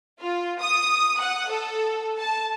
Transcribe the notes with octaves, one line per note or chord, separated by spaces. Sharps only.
F4
D#6
F#5
A4
A5